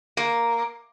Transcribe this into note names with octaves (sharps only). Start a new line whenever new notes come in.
A#3